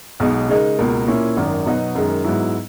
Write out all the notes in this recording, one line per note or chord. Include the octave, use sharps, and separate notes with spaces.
B1 B2 G#3 D#4
C#3 G#3 D#4 A#4
C#2 B2 A#3
A#2 A#3 C#4 E4
G#1 F#2 D#3
B2 F#3 B3 D#4 F#4
F#2 D#3 G#3
G#2 F#3 B3 E4